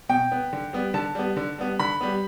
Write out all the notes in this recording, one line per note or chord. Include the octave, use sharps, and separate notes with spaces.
B2 G5
B3
D3
G3 B3
D3 A5
G3 B3
D3
G3 B3
D3 B5
G3 B3